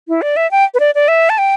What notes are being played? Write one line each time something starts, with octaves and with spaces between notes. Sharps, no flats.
E4
D5
E5
G5
B4
D5
D5
E5
A5
G5